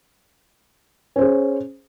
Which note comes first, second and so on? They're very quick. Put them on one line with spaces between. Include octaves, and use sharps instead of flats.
C#4 C5 G#4